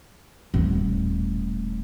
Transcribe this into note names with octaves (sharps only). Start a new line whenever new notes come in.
D#1 A2